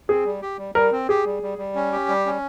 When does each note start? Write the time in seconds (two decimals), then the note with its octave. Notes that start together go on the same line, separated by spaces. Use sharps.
0.09 C4 G#4
0.25 G3
0.42 G4
0.58 G3
0.75 G3 A#4
0.92 C4
1.09 G4 G#4
1.26 G3
1.43 G3
1.58 G3
1.76 C#4
1.92 G4
2.09 G3
2.26 C#4